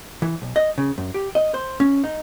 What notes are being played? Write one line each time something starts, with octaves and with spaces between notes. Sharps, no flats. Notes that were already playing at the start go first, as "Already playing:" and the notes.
E3
B1
D#5
C#3
F#2
G4
D#5
C5
C#4
D#4